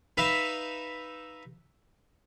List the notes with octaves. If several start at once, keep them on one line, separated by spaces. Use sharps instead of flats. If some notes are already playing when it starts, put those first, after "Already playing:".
D#4 B4 E5 F5 B5